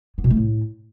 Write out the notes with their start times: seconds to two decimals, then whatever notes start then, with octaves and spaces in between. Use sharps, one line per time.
0.18 B3
0.24 B2
0.30 A3
0.37 A2